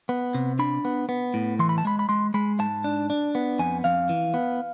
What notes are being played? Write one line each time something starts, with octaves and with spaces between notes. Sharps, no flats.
B3
C3
D4 B5
B3
B3
A2
E3 C6
B5
A5
G#3 B5
B5
G#3 C6
G#3 B5
G#2 A5
D4
D4
B3
F2 G#5
F2 F5
E3
B3